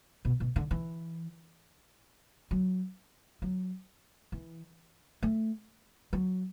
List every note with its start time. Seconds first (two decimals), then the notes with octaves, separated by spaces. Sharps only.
0.25 B2
0.40 B2
0.56 D3
0.71 E3
2.51 F#3
3.42 F#3
4.32 E3
5.23 A3
6.13 F#3